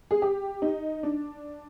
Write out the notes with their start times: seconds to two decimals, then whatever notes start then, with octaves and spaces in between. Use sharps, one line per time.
0.11 G#4
0.22 G4
0.62 D#4
1.03 D4